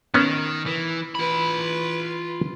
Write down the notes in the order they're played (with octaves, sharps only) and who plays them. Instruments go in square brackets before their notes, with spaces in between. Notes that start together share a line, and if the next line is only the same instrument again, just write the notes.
[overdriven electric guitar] D#3 [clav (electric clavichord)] B3 C#4
[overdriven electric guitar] E3
[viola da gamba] E3 B4 [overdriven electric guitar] F4 B5